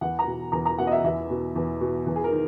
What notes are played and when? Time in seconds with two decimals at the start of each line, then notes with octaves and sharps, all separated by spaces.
0.01 E2 F#5
0.19 A#5
0.27 B2
0.52 E2 A#5
0.66 A#5
0.78 B2 F#5
0.87 D#5
0.92 E5
1.04 E2 E5
1.30 B2
1.56 E2
1.81 B2
2.07 E2
2.16 G#4
2.24 A#4
2.32 D#3